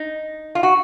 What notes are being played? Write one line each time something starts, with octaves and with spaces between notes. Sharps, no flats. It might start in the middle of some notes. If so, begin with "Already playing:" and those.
Already playing: D#4
F4
F#4